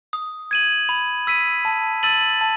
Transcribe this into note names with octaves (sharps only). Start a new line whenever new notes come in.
D#6
G#6 D#7 F#7
B5
E6 B6 D#7
A5
E6 A6 D#7 F#7
A5